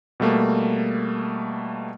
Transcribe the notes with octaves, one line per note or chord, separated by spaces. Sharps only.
B2 G3 A3 A#3